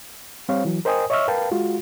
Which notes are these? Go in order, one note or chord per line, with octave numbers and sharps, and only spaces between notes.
G3 C4 C5 C#5 F5
E3 F#3
A#4 C5 D#5 G5 G#5 D#6
C#5 D#5 E5 C#6 E6 F6
A#4 B4 F5 G5 A5
G#3 F4 F#4